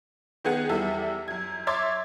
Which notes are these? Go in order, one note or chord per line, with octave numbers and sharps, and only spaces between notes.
D#3 B3 G#4 F#5
E2 G3 A4 E5 E6
F#2 G#6
C#5 E5 C6 D6 G#6 A6